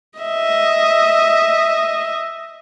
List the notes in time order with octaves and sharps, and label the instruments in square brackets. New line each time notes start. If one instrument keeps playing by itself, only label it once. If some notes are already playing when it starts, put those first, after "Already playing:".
[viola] D#5 E5